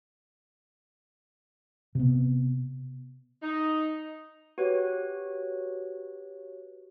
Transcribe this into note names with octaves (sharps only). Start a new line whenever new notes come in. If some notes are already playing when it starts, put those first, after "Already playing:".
C3 B3
D#4
F#4 G4 B4 C#5